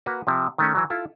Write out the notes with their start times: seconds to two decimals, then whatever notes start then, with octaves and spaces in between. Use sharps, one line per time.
0.06 A#3 F#4 B4
0.27 C3 F3
0.58 D#3 A3 C#4
0.75 E3 F#3
0.90 E4 F4 A4